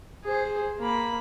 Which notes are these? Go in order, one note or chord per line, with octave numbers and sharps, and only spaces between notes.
G#4 C5
A#3 B5